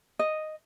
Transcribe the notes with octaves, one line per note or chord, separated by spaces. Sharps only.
D#5